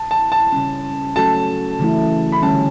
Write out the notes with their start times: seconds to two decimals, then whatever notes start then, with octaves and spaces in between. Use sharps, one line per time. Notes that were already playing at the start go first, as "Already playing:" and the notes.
Already playing: A5
0.11 A5
0.32 A5
0.52 C#3 G3 C#4
1.16 F#3 A3 C#4 F#4 A4 A5
1.79 C#3 E3 A3 E4
2.32 B5
2.42 D3 G3 C#4 A5